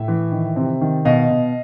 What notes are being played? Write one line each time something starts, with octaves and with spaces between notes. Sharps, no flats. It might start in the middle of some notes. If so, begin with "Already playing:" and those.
Already playing: A2 E5
E3
D#3
C3
D#3
B2 D#5 F5
B2